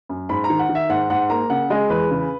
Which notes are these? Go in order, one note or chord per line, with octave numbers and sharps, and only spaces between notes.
F#2
G#2 B5
A#5
D#3
F#5
D#3
E5
G#2 F#5
G#2 F#5
A#3 A#5
C#3 F#5
G#3 D#5
E2 B4
C#3